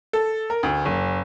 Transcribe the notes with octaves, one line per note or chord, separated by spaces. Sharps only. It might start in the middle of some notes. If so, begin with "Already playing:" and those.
A4
A#4
D2
F#1